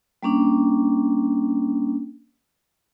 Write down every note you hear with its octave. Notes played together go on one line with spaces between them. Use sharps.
G3 A#3 C#4 D4